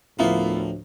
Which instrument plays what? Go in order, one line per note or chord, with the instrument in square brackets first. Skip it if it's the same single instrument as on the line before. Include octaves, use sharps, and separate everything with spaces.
[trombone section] D2 A2 [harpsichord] F3 A#3 [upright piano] B3 E4 F4